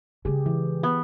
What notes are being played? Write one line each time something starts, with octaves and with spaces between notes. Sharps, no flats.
C#3 G#3 G4 G#4
E3
B3